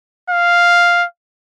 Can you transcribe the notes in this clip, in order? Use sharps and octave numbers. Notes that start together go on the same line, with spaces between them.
F5